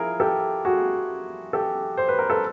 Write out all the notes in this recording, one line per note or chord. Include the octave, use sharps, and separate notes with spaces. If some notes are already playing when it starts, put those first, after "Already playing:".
Already playing: F3 E4 F4 G#4 A#4
G4 A4
F#4 G#4
G4 A4
C5
B4
A#4
A4 B4